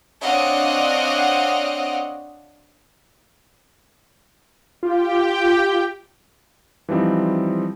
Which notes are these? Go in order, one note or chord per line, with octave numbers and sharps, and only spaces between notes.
C4 D4 C#5 D#5 F5 F#5
F4 G4 G5
E3 F3 G3 C4 D#4